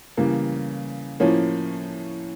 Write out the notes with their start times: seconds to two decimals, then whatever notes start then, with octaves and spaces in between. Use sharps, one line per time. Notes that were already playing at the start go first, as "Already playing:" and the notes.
0.17 C#3 E3 G3 A#3
1.20 A2 F3 A#3 C#4